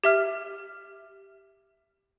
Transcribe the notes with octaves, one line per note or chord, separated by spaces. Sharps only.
G4 E5 F6